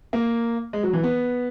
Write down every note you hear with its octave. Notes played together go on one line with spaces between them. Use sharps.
A#3
G#3
F#3
E3
B3